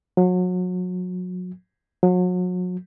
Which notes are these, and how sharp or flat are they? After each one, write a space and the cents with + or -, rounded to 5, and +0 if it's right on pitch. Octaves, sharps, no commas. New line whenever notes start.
F#3 -30
F#3 -35